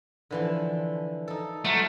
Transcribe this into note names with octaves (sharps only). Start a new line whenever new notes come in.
D3 E3 F3
D#4 A4
F#3 A3 F4 A#5